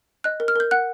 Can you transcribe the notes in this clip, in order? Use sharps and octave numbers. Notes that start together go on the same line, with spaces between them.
D#5 F#6
A#4
F6
A#4 G6
F#5 F#6